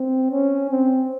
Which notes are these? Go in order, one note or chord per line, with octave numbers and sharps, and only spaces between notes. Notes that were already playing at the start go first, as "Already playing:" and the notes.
Already playing: C4
C#4
C4